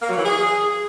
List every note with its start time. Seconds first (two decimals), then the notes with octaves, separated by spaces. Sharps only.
0.02 A#3
0.09 F#3
0.17 E3
0.25 G#4